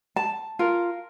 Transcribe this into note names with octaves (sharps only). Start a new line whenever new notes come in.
A5
F4 A#4